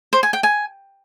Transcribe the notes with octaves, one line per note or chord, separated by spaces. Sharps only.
C5
G#5
G5
G#5